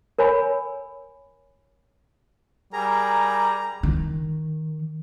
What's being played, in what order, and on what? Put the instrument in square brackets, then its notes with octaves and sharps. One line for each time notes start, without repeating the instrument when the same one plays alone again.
[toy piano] A#4 C#5 G#5 B5
[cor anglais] G3 [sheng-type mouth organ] G#4 A#4 [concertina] A#5
[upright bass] D#3